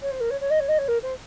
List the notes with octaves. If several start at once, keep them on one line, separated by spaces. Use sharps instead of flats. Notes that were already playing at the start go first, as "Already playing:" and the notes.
C#5
C5
A#4
C#5
C#5
D#5
C#5
D#5
C#5
A#4
C5